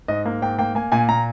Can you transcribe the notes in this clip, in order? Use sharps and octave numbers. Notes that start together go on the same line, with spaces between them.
G#2 D#5
A#3
G#2 G5
A#3 G5
A#3 G#5
A#2 G#5
A#2 A#5